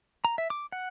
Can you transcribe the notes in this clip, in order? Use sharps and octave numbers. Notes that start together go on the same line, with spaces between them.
A#5
E5
D6
F#5